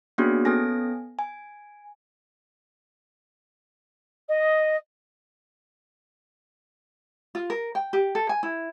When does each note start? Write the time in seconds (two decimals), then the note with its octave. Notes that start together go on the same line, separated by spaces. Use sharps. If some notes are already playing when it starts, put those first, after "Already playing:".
0.18 A#3 B3 C#4 D4 F#4 G#4
0.45 B3 C#4 A4 G#5 A#6
1.19 G#5
4.28 D#5
7.35 F4
7.50 A#4
7.75 G5
7.93 G4
8.15 A4
8.29 G#5
8.43 E4